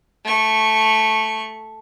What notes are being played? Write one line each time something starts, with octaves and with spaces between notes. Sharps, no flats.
A3 C#6